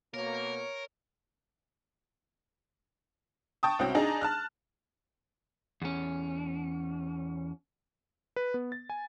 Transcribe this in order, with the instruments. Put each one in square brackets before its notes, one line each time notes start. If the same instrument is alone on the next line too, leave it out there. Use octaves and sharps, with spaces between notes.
[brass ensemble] B2 A#3 [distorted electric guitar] A#4 [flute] C#5
[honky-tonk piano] G5 A5 C#6 D#6
C2 C4 C#4 F#4 G5
D4 D#4 G#4 A#5
A5 F6 F#6
[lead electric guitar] E2 C#4
[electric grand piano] B4
B3
A6
G#5